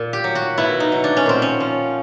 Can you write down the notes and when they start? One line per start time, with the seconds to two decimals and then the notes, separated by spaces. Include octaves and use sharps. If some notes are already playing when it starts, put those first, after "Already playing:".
Already playing: A#2
0.13 G4
0.24 F#3
0.35 F#4
0.58 B2 E4
0.80 D#4
0.92 F#3
1.04 D4
1.17 C#4
1.26 A#2 C4
1.42 C#4
1.60 F3